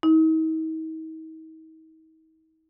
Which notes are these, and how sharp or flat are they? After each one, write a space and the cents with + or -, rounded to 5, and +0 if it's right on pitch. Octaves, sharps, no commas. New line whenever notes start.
D#4 +45